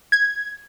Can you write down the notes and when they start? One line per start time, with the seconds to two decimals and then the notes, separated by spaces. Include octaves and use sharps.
0.12 G#6